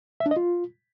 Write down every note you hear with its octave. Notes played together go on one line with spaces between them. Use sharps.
E5
D4
D#5
F4